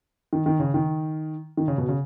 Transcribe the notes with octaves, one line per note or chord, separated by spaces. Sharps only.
D#3
D#3
C#3
D#3
D#3
C#3
B2
C#3